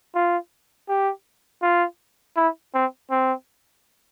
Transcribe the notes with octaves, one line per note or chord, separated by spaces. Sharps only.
F4
G4
F4
E4
C4
C4